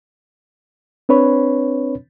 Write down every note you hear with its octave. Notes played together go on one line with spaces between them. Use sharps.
C4 D4 B4 C#5 B5